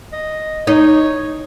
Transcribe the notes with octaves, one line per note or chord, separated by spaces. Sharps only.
D#5
D#4 C#5